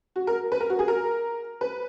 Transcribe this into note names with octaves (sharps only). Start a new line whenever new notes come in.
F#4
A#4
B4
A#4
F#4
G#4
A#4
B4